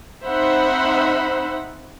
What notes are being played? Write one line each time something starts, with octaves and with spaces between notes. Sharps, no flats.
C4 D#4 C5 E5 F#5 B5